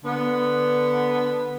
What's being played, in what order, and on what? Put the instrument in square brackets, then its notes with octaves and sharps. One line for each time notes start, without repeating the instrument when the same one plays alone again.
[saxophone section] D3 B3